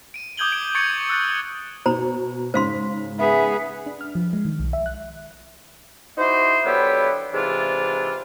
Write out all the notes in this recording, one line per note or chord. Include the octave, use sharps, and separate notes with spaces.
D7 D#7
D6 D#6 G6 G#6 F#7 G7
D7
C#6 G#6 A6 C#7 D7
E6 F#6 A6
B2 C5 A#5
G#2 C#3 C5 F5 C6
B3 G#4 E5
D4
F6
F3
G#3
D#3
B1
E5
F#6
D#4 E4 F#4 C5
D3 F#3 B3 E4 G4
G#2 C3 E3 D4 F4